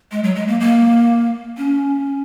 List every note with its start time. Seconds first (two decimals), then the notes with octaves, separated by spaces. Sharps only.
0.12 G#3
0.24 F#3
0.36 G#3
0.48 A#3
0.60 A#3
1.58 C#4